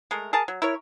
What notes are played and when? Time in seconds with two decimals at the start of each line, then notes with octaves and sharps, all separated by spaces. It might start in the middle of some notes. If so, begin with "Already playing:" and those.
0.11 G#3 A3 A#4
0.33 G#4 A#4 A5
0.48 F#3
0.62 E4 A#4 C#5